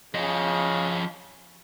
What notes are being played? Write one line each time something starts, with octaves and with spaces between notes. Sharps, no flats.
C#3 F3 D#5